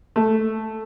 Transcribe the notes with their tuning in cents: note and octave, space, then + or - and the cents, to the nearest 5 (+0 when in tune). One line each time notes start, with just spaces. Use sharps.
A3 -5